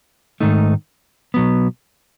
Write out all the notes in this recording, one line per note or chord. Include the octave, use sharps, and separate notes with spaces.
G#2 D#3 A3 D#4
B2 F#3 B3